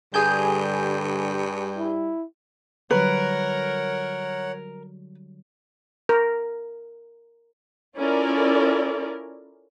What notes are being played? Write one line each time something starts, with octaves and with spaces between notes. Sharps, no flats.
G2 D3 G3 G#4 G#5 G6
E4
D3 F#3 G3 A#4 B4 C#5 F#5
A#4
C#4 E4 F4 A4 A#4 D5